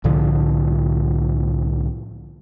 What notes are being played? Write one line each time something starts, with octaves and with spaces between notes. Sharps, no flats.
C2 A2 D3 F3